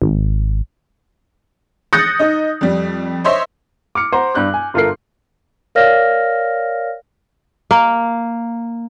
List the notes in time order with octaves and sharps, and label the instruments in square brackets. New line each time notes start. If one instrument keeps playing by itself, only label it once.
[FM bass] G#1
[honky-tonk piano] D#6 F#6 G6 A6 A#6 C#7
D#4 D#5
F2 G3
C5 C#5 D#5 E5 C6
[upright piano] D6 F6 C#7
C5 F#5 A#5
G2 D4 F#6 G6
G#5
G1 F4 A4 A#4 C7
[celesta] A#4 C#5 D5 F5 F6 A#6
[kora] A#3